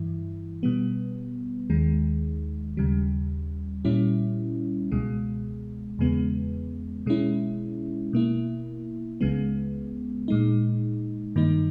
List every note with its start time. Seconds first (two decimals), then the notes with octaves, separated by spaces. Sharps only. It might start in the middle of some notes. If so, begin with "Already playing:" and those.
Already playing: G2 E3 E4
0.63 B2 G3 B3
1.70 D#2 D#3 G#3
2.77 D#2 C#3 G3
3.85 A#2 G3 C#4 E4
4.92 C#2 B2 G#3
5.99 E2 C#3 G#3 B3
7.06 B2 G#3 C#4 E4
8.13 B2 A#3 E4
9.21 C#2 C#3 G#3 B3
10.28 A#2 G#3 D#4
11.36 G2 D#3 A#3 D#4